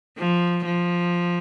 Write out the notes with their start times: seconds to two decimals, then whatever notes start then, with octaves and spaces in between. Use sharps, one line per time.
0.18 F3
0.65 F3